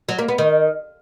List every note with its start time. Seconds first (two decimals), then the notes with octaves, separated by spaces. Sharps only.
0.09 F#3
0.18 A#3
0.28 B3
0.38 D#3